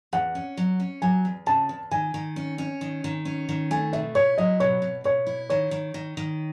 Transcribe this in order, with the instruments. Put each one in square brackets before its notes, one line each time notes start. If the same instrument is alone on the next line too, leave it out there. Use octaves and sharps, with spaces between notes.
[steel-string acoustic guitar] E2 [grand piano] F#5
[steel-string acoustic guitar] C#4
F#3
C#4
[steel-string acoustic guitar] F#3 [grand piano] G#5
[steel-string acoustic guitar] E2
[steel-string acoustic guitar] C#3 [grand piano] A5
[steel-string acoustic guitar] E2
[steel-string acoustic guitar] D#3 [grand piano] G#5
[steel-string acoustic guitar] D#3
C#4
C#4
D#3
D#3
C#4
D#3
[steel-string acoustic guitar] A3 [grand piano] G#5
[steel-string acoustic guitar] B2 [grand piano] E5
[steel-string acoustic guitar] E4 [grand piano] C#5
[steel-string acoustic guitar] F#3 [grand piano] D#5
[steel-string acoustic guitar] B2 [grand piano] C#5
[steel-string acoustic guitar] B2
[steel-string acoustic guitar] B2 [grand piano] C#5
[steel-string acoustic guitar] E4
[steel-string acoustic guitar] D#3 [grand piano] C#5
[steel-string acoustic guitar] D#3
D#3
D#3